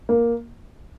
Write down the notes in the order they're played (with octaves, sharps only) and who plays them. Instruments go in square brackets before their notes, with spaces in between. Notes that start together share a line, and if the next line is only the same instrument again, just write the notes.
[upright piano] A#3